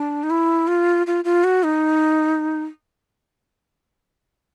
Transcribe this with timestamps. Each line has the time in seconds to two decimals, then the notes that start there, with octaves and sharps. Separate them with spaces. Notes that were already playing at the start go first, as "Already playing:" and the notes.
Already playing: D4
0.23 D#4
0.30 E4
0.68 F4
1.07 F4
1.25 F4
1.44 F#4
1.63 D#4